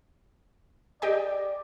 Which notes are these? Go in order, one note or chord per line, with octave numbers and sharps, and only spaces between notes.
G4 D5 D#5 G5